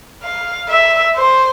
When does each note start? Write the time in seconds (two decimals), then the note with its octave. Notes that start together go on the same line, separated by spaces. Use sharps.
0.23 F5
0.69 E5
1.16 C5